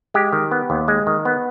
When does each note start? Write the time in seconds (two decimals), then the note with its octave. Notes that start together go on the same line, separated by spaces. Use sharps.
0.14 G#3 G4
0.33 D#3
0.51 B3
0.70 D#2
0.88 G#3
1.07 D#3
1.25 B3